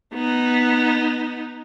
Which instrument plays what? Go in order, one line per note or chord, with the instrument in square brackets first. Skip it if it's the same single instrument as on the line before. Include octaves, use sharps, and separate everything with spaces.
[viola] B3 D#4